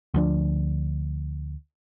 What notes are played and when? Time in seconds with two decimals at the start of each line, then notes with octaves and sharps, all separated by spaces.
0.14 D2 F3 D4